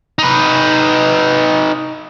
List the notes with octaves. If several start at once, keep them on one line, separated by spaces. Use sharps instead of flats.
D#4 B4